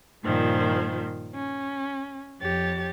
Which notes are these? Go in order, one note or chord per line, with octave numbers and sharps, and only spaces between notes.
G2 A#2 D#3 F3 C5
C#4
F2 G4 C#5 A6